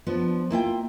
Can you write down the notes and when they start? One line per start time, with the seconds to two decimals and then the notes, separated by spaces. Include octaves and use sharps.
0.07 F3 B3 D4
0.51 A#3 E4 F4 G5